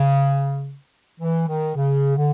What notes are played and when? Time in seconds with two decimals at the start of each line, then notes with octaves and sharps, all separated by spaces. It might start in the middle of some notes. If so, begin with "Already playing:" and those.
Already playing: C#3
1.21 E3
1.48 D#3
1.76 C#3
2.17 D3